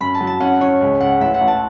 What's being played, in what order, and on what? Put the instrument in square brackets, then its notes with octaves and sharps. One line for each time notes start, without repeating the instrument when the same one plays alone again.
[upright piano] F#2 [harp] B5
[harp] A5
[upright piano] F#3
[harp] A5
[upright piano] C#4 [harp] F#5
[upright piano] C#4 [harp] C#5
[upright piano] C#2
[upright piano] C#2 [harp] F#5
[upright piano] A1 [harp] E5
[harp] F#5
[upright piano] A1
[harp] A5